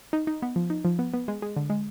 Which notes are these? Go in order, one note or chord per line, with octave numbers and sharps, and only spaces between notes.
D#4
D#4
B3
F3
D#4
F3
B3
B3
G#3
G#3
D3
G#3